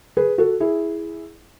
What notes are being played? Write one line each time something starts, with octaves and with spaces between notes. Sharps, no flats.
G#4 B4
F#4 A4
E4 G#4